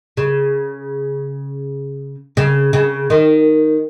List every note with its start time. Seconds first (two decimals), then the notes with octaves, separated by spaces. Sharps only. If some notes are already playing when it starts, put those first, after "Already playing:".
0.17 C#3
2.37 C#3
2.73 C#3
3.10 D#3